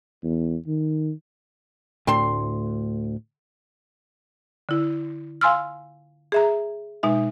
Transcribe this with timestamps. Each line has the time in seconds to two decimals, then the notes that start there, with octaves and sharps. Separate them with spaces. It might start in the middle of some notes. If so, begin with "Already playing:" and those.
0.23 E2
0.67 D#3
2.07 D2 A2 C4 D4 A4 C6
4.69 D3 E4
5.41 F5 G#5 C6 E6 F6
6.32 G#4 E5 A#5
7.03 B2 G#3 D#4 E5